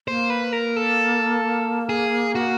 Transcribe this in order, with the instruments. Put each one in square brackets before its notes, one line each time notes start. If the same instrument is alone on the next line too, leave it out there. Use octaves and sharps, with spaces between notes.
[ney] A#3 [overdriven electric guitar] C5
[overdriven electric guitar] B4
A#4
A4
G#4
F#4